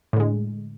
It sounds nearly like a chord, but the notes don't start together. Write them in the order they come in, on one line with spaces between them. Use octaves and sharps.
A2 D3 G#3